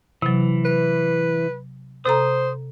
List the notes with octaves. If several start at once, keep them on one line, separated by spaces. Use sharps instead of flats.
C3 E3 F#3
B4
C3 A4 C5 A#5 D#6